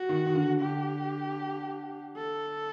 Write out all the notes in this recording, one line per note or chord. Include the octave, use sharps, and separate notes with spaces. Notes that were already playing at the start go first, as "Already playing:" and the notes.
Already playing: F#4
D#3
D#3
D3
D3 G4
A4